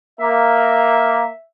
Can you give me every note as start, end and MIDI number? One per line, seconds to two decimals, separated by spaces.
0.20 1.26 58
0.20 1.44 76